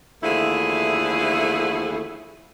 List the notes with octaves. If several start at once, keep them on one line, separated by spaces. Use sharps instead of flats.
D#2 D3 F3 A3 E4 G#4